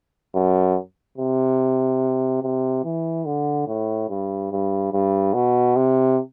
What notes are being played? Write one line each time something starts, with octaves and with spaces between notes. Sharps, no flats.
F#2
C3
C3
E3
D3
A2
G2
G2
G2
B2
C3